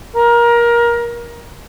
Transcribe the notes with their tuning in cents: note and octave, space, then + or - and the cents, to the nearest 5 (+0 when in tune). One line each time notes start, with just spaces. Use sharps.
A#4 +20